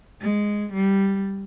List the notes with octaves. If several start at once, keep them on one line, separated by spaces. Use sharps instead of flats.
G#3
G3